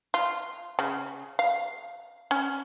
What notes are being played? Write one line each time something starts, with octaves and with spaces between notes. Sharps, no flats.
F4
C#3
F5
C#4